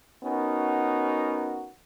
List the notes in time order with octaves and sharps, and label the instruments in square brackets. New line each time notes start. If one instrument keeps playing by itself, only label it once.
[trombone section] B3 C#4 D#4 F#4 A#4